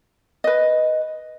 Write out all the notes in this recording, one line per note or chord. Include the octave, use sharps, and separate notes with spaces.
B4 D#5